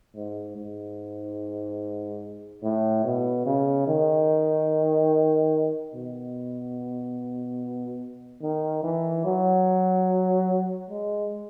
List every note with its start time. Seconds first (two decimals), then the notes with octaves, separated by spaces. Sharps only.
0.15 G#2
0.56 G#2
2.63 A2
3.04 B2
3.46 C#3
3.87 D#3
5.94 B2
8.43 D#3
8.83 E3
9.25 F#3
10.90 G#3